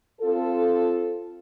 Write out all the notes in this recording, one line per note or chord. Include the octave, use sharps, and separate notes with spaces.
C4 F4 A4